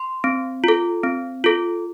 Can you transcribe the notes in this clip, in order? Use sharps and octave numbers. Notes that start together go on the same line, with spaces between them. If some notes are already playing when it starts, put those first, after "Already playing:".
Already playing: C6
C4
F4 A4
C4
F4 A4